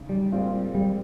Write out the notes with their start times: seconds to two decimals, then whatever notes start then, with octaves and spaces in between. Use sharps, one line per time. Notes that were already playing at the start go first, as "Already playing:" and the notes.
Already playing: C#3 G#3 D#4
0.09 G3
0.32 A#2 G#3 C4 F4
0.75 G3